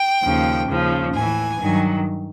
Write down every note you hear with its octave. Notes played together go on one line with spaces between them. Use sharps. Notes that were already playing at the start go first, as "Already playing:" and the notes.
Already playing: G5
D#2 C#3 F3
D#2 C#3 F3
A2 E3 G#5
G2 D#3 F#3